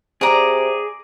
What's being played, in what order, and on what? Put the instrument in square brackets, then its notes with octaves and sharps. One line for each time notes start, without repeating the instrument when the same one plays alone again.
[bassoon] C3 [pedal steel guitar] G#4 [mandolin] D5 A#5